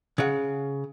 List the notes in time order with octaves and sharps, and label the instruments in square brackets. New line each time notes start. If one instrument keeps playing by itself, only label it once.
[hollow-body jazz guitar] C#3 F#5